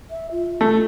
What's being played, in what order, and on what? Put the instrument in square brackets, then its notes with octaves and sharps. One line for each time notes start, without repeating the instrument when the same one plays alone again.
[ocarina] E5
F4
[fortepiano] A3